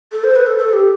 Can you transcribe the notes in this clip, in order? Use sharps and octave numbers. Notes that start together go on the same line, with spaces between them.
A4
C5
B4
A4
A4
G4